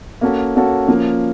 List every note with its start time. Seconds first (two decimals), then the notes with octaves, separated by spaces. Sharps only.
0.21 A#3 C#4 F#4 A4
0.55 A#3 C#4 F#4 A4
0.87 F3 A#3 C#4